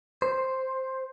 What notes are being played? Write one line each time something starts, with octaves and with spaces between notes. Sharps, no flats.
C5